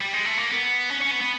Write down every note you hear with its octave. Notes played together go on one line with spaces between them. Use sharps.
G3
G#3
A3
A#3
B3
C#4
C#4
B3
B3